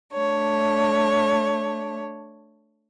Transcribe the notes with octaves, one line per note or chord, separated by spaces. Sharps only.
A3 D4 C#5